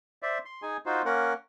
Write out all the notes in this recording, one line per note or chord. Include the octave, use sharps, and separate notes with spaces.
C5 D5 E5
C6
D#4 G#4 G#5
D#4 F4 F#4 C5
A#3 C#4 A#4 F#5